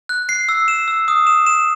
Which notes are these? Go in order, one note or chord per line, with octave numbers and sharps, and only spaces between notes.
F#6
C7
E6
E7
E6
D#6
E7
E7